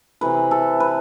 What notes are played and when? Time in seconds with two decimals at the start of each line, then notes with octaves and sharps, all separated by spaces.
0.21 C3 E3 A3 B4
0.51 A4
0.80 B4